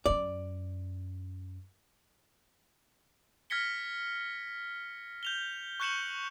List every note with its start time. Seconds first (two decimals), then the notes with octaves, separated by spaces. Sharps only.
0.06 F#2 C#4 D5
3.50 F6 G#6 A#6 B6 C#7 G7
5.23 G6 F7 G7
5.80 C#6 F#6 G6 C#7 E7 F#7